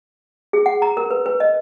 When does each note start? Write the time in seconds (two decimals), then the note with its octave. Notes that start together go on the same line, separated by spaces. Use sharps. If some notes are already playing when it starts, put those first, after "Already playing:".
0.53 G#4
0.66 F#5
0.82 A#5
0.97 A#4
1.11 B4
1.26 B4
1.40 D#5